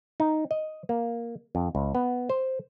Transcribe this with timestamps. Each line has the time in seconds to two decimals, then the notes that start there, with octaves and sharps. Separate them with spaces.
0.20 D#4
0.51 D#5
0.89 A#3
1.55 F2
1.75 C#2
1.95 B3
2.30 C5